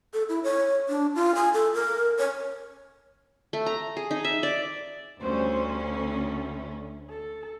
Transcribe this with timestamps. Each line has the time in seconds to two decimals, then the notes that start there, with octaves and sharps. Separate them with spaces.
0.14 A4
0.29 E4
0.44 C#5
0.89 D4
1.15 F4
1.35 G#5
1.54 A4
1.74 A#4
2.19 C#5
3.53 A3
3.66 A#5
3.97 G#4
4.11 D#4
4.24 E5
4.43 D5
5.21 D2 G3 C#4 C5
5.88 A3
7.10 A4